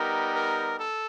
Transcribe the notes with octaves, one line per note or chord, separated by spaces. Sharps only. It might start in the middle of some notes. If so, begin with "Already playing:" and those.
Already playing: G3 B3 D#4 G4 A#4
A#4
A4